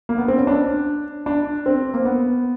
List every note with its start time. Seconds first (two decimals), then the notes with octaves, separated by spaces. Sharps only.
0.09 A#3
0.18 B3
0.28 C4
0.38 C#4
0.47 D4
1.26 D4
1.66 C4
1.94 A#3
2.05 B3